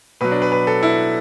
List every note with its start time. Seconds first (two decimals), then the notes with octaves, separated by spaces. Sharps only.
0.21 B2 F#3 B4
0.32 D4
0.42 B4
0.52 B4
0.67 A4
0.83 E4